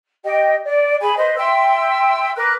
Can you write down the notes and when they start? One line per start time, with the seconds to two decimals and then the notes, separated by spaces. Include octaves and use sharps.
0.23 G4 D#5 G5
0.64 D5
1.00 G#4 G#5 B5
1.16 B4 C5 D#5
1.37 E5 G5 C6 E6
2.36 A#4 B4 D6 F#6